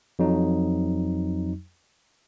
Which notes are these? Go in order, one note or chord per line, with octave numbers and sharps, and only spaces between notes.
F2 F#3 D#4